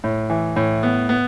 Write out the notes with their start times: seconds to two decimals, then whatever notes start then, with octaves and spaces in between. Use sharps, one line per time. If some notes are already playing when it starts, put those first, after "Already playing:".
0.04 A2
0.30 E3
0.56 A2
0.83 B3
1.09 B3